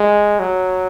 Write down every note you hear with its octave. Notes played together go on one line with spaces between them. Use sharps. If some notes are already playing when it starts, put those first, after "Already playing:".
Already playing: G#3
F#3